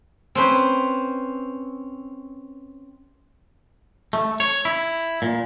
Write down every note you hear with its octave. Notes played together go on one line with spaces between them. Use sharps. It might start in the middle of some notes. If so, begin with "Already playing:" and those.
C4 C#4 B4 C5
A3
C#5
E4
A#2